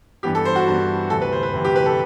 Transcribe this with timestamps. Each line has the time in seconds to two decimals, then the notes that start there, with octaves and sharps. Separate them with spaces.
0.23 G2 E3 B3 G4
0.35 A4
0.45 C5
0.56 F#4
0.68 G2 E3 B3
1.10 D2 C3 E3 A4
1.22 B4
1.32 C5
1.43 B4
1.53 D2 C3 E3
1.65 G4
1.76 B4
1.86 A4